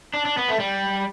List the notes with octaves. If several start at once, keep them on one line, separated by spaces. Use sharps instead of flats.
D4
D4
B3
A3
G3